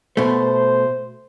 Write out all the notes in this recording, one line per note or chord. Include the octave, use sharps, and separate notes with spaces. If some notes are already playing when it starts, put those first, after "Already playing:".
B2 A3 C5